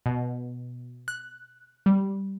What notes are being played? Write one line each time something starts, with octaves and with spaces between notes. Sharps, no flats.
B2
F#6
G3